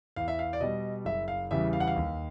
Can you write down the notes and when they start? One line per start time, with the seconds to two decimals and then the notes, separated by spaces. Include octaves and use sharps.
0.16 E2 F5
0.28 E5
0.39 F5
0.53 D5
0.60 B2 G3 D#5
1.05 F#1 E5
1.28 F5
1.51 E2 C#3 E3 G3 E5
1.73 F5
1.80 F#5
1.88 F5
1.96 D#2